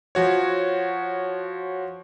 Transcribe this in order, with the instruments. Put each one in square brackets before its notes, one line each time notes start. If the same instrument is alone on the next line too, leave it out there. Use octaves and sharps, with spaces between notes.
[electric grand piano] F3 F#4 C#5